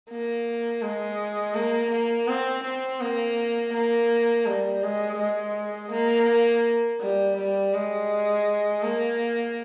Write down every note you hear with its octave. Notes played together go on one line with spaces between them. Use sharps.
A#3
G#3
A#3
A#3
C4
C4
A#3
A#3
G3
G#3
G#3
A#3
G3
G3
G#3
A#3